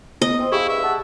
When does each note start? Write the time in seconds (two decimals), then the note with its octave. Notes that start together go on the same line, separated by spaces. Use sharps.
0.22 B3 D#5
0.38 C4
0.52 E4 G4 G#4 F5 C#6
0.69 G2 E5
0.83 F#5 A5